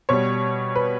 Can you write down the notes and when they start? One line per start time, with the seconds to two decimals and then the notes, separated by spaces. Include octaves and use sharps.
0.09 B2 G3 C#5
0.75 B4